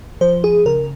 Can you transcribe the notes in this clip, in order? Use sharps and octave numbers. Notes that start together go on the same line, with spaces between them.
F3 C5
G#4
C#3 A#4